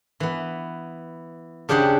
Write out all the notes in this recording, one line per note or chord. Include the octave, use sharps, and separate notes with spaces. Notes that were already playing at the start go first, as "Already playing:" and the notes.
E3 B3
C#3 D4 G4 G#4 C5 F#5